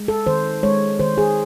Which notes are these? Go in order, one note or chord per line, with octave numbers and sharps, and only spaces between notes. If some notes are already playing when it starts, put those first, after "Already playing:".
Already playing: G#3
A4
D#3 C5
G#3 C#5
D#3 C5
G#4